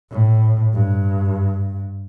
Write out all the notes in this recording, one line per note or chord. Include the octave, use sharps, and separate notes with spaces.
A2
G2